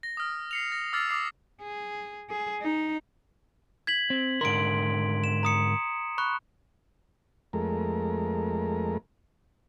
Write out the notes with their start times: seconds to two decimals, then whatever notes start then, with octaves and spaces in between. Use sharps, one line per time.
0.03 A#6
0.17 D#6 F6
0.51 C7 C#7 F7
0.72 A#6
0.93 D6 E6 F6 A6 C7
1.10 D6 D#6 C7
1.61 G#4
2.30 G#4
2.62 D#4
3.87 G#6 B6 F#7
4.10 C4
4.41 G#2 D3 A#4 C6 D7
5.24 E7
5.43 A#5 D#6 C#7
6.18 B5 C#6 F#6
7.53 F2 G#3 A3 A#4